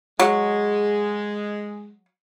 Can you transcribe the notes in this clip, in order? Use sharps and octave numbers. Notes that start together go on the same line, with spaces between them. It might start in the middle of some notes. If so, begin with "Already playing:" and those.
F#3 G#3